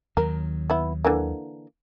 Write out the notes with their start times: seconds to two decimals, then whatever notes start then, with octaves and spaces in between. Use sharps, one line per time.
0.17 D#2 D#3 F#3 A#4
0.70 B3 E4
1.05 D3 E3 A#3